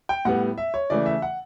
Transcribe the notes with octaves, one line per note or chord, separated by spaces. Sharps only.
G5
A2 G3 B3 F#5
E5
C#5
C#3 E3 A3 D5
E5
F#5